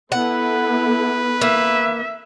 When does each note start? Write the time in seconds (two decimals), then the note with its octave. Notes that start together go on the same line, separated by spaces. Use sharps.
0.12 B3 E4 A4 B4 F#5
1.41 A#3 E5